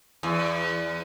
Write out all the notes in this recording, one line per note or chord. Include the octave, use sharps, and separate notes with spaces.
E2